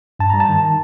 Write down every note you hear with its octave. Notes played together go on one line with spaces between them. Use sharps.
G2 A5
G3 A#5
A5
D#3